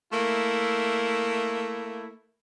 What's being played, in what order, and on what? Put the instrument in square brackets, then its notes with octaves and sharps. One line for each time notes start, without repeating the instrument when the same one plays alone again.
[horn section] A3 A#3 E4